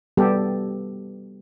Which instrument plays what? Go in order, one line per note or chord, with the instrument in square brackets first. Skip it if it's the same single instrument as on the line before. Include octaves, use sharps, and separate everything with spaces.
[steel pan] G3 B3 G4 A4